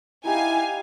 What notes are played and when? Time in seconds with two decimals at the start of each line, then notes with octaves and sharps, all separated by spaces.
0.25 D#4 E4 G4 F5 G#5